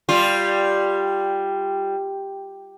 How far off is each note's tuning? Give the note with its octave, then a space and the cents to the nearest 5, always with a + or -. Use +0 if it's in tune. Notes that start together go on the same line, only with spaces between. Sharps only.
G3 +0 F4 +0